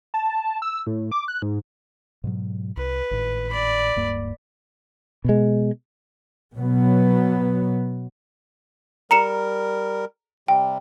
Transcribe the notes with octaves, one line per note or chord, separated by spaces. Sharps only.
A5
E6
A2
D6
F#6
G#2
G#2 B2 F#3
C2 B4
G#1 A2
D5 B5
D1 G2 A#3
B2 G#3
B2 F#3 B3
G3 A#4 A#5 C#7 E7
C3 G3 G5